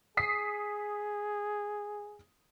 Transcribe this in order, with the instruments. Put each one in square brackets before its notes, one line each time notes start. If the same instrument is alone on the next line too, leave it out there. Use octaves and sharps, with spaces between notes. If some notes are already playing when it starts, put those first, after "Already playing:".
[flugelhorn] G#4 [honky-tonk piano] D#6 B6 C7